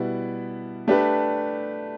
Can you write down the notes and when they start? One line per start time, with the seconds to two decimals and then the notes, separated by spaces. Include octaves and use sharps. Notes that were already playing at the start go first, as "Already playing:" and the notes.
Already playing: B2 G3 E4 B4
0.88 A3 D4 G4 B4